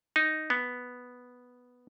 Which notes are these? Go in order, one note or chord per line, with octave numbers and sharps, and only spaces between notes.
D#4
B3